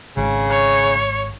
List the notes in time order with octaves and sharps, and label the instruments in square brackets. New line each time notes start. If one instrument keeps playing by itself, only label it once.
[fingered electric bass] G#1 [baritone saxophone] C#3
[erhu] C#5